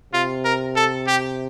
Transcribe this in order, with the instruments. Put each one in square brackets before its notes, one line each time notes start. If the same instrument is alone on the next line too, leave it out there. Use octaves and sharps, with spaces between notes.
[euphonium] C3 [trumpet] F4
[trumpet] A#4
A4
G4